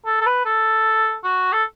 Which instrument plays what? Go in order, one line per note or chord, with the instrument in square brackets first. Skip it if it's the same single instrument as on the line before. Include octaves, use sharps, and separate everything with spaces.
[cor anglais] A4
A4
B4
A4
F#4
A4